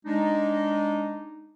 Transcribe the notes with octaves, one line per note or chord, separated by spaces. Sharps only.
G#3 D4 D#4